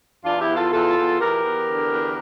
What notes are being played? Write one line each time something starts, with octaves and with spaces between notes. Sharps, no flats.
E2 D4 F4
E4 G4
E2
F4 A4
E2 F4 A4
E2
E2 G4 A#4
E2
D3
E2